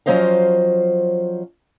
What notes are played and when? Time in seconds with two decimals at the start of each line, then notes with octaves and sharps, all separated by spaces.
0.06 F3 F#3 C#4 C5 D#5 F5